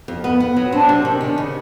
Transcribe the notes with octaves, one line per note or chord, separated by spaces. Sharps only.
F2
B3
B3
F#3
C4 D4
C3
D#3
C#4
C#3